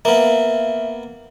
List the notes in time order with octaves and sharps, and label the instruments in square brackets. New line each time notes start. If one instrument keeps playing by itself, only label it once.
[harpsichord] A#3 B3 [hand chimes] E5 F5